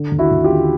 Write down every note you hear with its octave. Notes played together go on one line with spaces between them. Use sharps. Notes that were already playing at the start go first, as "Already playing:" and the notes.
Already playing: D3
D#2
E4 F#4
D#2
F4 G4
D3